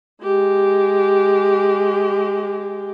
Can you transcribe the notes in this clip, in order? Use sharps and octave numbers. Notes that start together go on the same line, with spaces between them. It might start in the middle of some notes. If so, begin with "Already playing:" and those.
G#3 G4